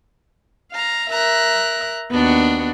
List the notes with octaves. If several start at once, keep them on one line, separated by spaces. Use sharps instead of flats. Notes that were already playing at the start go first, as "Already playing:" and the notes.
F5 A#5
A#4 E5 A#5 F#6
D#2 B3 D4 F#4